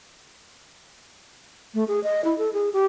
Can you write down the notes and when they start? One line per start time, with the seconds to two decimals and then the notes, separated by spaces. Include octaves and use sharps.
1.74 A3
1.88 G#4
2.04 D#5
2.25 E4
2.38 A4
2.53 G#4
2.73 G4